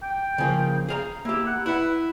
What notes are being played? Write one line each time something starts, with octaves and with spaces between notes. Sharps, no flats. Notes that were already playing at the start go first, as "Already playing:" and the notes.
G5
C#3 F3 A#3
G#4 F5 A#5
A#3 E4 G4
F#5
E4 B4 F#5